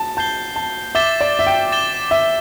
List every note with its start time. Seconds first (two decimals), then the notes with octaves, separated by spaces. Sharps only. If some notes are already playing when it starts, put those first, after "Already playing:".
Already playing: A5
0.17 A5 G6 C7 G7
0.56 A5
0.95 E5 D6 A6 E7 G7
1.21 D5
1.39 E5
1.47 G5
1.72 D6 A6 E7 G7
2.11 E5